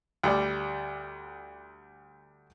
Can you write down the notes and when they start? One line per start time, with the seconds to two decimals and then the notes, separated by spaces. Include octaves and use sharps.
0.23 D2 G3 D5